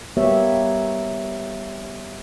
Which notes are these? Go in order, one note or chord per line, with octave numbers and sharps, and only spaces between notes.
G3 A#3 B3 G4 C#5 E5